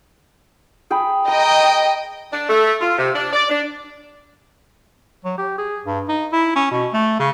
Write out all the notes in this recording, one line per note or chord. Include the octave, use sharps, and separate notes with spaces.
G#4 G5 B5
D#5 G5 A#5
D4
A3
F4
C3
D4
D5
D4
F#3
G4
G#4
G2
D#4
E4
C#4
B2
A3
C#3